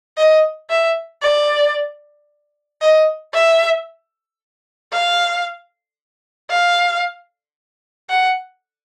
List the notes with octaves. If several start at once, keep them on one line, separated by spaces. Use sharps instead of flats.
D#5
E5
D5
D#5
E5
F5
F5
F#5